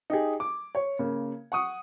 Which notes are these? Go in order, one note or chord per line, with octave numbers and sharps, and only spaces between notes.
D#4 G4 G#4
D6
C#5
C#3 A#3
F#5 C#6 D#6